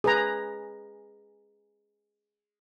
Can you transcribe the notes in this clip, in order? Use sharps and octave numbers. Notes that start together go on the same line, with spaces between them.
G#4 B4 A#5